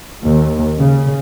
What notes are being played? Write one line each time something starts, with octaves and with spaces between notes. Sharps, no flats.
D#2
C#3